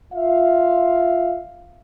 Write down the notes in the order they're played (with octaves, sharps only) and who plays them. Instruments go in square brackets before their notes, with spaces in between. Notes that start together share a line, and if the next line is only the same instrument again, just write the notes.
[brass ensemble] F4 E5 F5